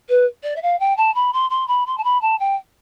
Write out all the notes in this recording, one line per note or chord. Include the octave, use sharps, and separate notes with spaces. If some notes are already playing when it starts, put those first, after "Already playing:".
B4
D5
E5
F5
G5
A5
B5
C6
C6
B5
C6
A5
B5
A5
G5